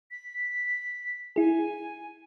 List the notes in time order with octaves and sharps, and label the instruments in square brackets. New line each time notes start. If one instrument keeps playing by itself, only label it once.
[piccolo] B6
[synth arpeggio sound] E4 G#4 [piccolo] G#5